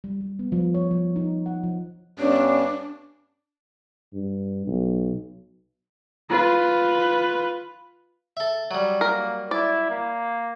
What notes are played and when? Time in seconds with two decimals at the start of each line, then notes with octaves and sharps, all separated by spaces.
0.04 G3
0.21 G3
0.39 B3
0.52 F3
0.74 C#5
0.91 F3
1.16 D#4
1.46 F#5
1.63 F3
2.19 G2 B3 C#4 D4
4.13 G2
4.67 B1
6.30 F4 B4
8.37 A4 E5
8.71 F#3 G3
9.01 A#3 A#4
9.51 E4 D5
9.90 A#3